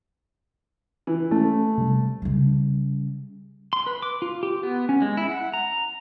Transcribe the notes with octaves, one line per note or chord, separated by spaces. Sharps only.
E3
A3 C#4
C3 G3
C#3 G3
C6
B4
D6
F4
G4
B3
C#4
G#3
E4
F#5
A#5